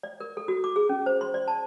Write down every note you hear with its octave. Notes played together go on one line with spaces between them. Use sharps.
D5
A#4
A4
F#4
D6
G#4
C#4
C5
C6
D5
A5